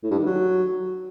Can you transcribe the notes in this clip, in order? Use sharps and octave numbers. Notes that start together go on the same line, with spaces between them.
A2
G2
D#3
F#3